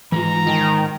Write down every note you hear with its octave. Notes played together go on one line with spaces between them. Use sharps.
G#2 E3 G#3 F4 A#5
D#3 D#5 G5 A5